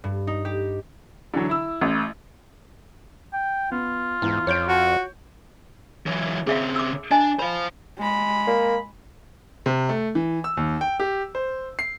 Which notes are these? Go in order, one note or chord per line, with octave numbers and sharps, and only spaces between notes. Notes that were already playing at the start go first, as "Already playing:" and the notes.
G2
D#4
G4
D3 E3 F#3
E4 E6
A1
G5
B3 F4
E2 G#2
F2 C#5 G6 D7
F#4
E3 F#3
C#3 C4 G#4 E5 F5
D6 E6
D4 D#5 G#5 A5
C5 F5 B5
G#3 B5
A#3
C3
A3
E3
E6
D#2
G5
G4
C5
C7